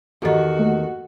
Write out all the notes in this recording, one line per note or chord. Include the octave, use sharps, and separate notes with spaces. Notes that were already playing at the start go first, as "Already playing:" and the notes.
E2 D#3 F#4 G4 A4 D#5
A3 A#3